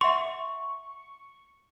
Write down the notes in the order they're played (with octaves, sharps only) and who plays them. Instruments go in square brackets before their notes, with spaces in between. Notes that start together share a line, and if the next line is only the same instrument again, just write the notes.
[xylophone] E5 F#5 C6 [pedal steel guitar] C#6